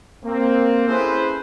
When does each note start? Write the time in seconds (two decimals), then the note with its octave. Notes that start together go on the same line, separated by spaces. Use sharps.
0.24 A#3 C4
0.88 C#4 E4 G#4 A4 B4 C5